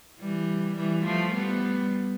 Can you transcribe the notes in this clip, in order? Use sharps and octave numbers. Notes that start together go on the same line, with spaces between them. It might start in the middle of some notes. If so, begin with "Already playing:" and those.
E3 G3
E3 G3
F3 A3
G3 B3